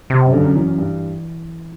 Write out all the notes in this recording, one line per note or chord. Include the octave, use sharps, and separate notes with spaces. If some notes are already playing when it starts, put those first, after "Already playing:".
C3
F#2
G2 D3
F#2
F#2 E3
F#2
G2